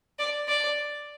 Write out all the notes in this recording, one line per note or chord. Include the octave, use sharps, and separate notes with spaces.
D5
D5